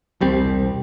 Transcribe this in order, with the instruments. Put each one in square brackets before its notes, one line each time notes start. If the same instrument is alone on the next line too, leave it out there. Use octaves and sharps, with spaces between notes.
[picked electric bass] E1 C2 G3 C4